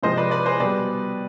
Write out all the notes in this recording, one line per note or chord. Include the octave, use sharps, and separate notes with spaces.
C3 F3 G#3 C5 D#5
B4 D5
B4 D5
G#4 C5
B2 G3 B4 D5